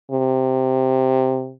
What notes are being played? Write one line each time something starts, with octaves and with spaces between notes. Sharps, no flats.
C3